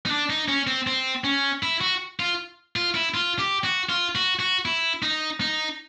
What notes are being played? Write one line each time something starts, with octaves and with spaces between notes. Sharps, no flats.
D#4
D4
D#4
C#4
C4
C4
C#4
E4
F#4
F4
F4
E4
F4
G4
F#4
F4
F#4
F#4
E4
D#4
D#4